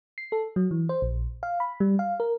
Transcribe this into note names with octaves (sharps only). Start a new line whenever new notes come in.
C7
A4
F#3
E3
C5
A#1
F5
B5
G3
F5
A#4